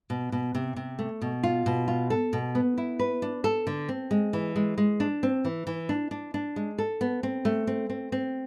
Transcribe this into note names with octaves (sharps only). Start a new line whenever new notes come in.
B2
B2
C3
C3
A3
B2
F4
B2
F4
A4
B2
B3
E4
B4
D4
A4
D3
C4
G#3
E3
G#3
G#3
D4
C4
E3
E3
D4
D4
D4
G#3
A4
B3
C4
A3
C4
C4
C4